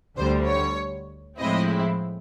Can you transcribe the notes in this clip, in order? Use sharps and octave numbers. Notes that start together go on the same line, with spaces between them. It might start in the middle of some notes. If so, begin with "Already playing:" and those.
D2 D3 G3 C5
C#5
A2 F3 G#3 C4 E4 D#5